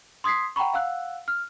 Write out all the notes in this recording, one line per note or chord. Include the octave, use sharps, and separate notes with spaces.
C6 D#6 G#6 B6 C7
F#5 G5 A#5 B5 C#6
F5 F#5 E6 F#6
F6